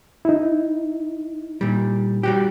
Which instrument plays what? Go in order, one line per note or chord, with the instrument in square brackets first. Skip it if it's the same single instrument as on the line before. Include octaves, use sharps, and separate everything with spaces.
[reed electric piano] D#4 E4
[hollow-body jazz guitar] A#2 G3
G3 F#4 G4